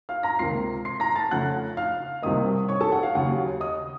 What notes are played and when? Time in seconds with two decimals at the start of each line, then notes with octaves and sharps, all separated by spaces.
0.09 F5 F6
0.23 A#5 A#6
0.39 C#2 C3 D#3 A#3 C6 C7
0.85 C6 C7
1.00 A#5 A#6
1.16 A5 A6
1.31 F2 C#3 A3 F#5 F#6
1.77 F5 F6
2.23 C2 C3 D#3 A#3 D#5 D#6
2.68 C#5 C#6
2.81 A4 A5
2.92 F#5
3.03 F5
3.15 D#2 C#3 F#3 F#5
3.60 D#5 D#6